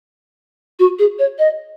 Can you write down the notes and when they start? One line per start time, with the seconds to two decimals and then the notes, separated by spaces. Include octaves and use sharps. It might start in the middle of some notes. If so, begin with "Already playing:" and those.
0.79 F#4
0.99 G#4
1.19 C#5
1.39 D#5